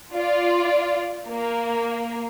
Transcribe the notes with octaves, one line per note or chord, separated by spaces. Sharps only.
F4 D5
A#3